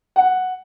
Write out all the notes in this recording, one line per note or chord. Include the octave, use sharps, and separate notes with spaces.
F#5